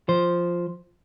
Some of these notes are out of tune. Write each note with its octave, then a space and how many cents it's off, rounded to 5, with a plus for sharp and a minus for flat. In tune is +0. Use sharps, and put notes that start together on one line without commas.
F3 +0 C5 +0